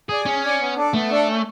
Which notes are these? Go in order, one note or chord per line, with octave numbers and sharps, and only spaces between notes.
G#4 D5 G#5
C#4 G#4
D5 G#5
B3
D4 A4 D5
A3 B3
D4 A4 D5
C#4